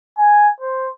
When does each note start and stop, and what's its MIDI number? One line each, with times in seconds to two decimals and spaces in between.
0.18 0.50 80
0.61 0.88 72